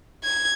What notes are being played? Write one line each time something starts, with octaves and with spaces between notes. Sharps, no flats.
G#6